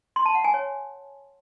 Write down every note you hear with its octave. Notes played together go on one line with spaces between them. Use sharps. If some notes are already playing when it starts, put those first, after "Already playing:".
C6
A5
F#5
G#5
C#5